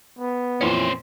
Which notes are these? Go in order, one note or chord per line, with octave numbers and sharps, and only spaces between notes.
B3
F2 A#2 E3 C#4 C5